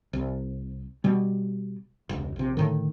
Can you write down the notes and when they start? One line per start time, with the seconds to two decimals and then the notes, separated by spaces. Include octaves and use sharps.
0.13 C2
1.04 B2 G3
2.09 E1 C#2
2.36 A#1 C3
2.57 A2 D3 D#3